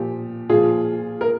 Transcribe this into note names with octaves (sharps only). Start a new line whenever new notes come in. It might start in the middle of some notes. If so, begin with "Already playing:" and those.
Already playing: A#2 F3 G4
A#2 F3 F4 G#4
A#4